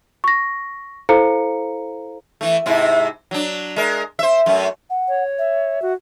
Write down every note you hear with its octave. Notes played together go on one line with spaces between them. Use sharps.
C#6 A#6
E4 A4 C5 F5 A#5 C#7
E3 A3
G#2 C3 E4
F#3 D4
G#3 A#4
C5 E5
F#2 A3
F#5
C#5
E5
F#4